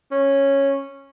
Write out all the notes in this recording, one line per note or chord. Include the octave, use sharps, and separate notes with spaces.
C#4